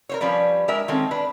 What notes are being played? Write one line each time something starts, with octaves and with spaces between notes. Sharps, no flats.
A#4 C5 C#5
F3 G3 C#4 B4 D5
G#3 D4 A#4 E5
D#3 G#3 C4 C#4 A4
D4 B4